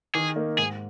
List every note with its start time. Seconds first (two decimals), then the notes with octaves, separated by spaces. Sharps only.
0.15 D#3 G#4
0.36 A#3 D#4
0.58 G#2 G#4